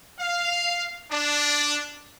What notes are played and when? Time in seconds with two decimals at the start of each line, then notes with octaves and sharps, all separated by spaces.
0.19 F5
1.10 D4